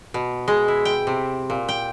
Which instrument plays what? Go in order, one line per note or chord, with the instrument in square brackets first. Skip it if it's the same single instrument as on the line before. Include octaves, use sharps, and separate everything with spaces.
[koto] B2
G#3
E4
G5
C3
A#2
G5